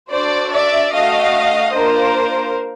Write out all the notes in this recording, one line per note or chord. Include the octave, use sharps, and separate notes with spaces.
D4 F#4 A4 C5 D5
D5 E5
A3 D4 F#4 D#5 F5
A#3 D4 F4 A#4 C5